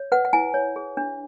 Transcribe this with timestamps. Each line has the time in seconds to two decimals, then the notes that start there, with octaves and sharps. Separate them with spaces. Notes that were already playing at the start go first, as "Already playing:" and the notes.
Already playing: C#5
0.12 B4 F#5
0.25 F#5
0.33 E4 G#5
0.54 C#5
0.76 G#4
0.97 D4